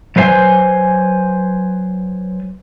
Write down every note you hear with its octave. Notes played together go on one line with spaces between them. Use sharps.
F#3 B4 C5 E5 G#5